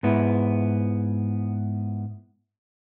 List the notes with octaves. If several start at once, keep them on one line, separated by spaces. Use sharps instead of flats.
G#2 B3 E4